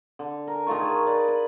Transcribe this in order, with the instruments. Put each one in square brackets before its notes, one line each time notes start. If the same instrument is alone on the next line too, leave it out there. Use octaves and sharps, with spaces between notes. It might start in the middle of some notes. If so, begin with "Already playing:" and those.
[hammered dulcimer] D3
A#4 G#5
D#3 A3 F4 C#6
G#4
B4 D5
B5